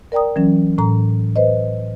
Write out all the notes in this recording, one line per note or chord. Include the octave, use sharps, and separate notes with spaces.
A#4 D5 G5 A#5 D#6
E3 F#3 C#4
A2 A#5
B4 C5 D#5